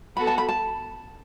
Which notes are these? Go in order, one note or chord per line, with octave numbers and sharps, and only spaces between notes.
B3 F#4 A4 B5
A5
B5
A5